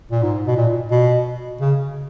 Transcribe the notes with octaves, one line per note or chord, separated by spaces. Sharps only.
A#2
G#2
B2
A#2
B2
C#3